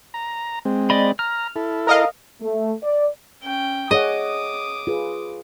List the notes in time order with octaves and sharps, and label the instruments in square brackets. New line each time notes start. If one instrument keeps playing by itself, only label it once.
[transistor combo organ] A#5
G#3 C4
[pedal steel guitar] D5 D#5 B5
[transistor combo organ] A#5 [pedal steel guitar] F6
[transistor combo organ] E4 A4
[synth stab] A#4 D#5 F5
[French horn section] A3
D5
[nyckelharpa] C#4 G5
[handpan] G#4 C#5 F#5 [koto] D#5 [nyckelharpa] D6 D#6
[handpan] F4 G#4 B4